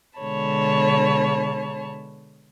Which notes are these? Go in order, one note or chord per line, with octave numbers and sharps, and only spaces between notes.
B2 D3 G#3 C#5 A5 B5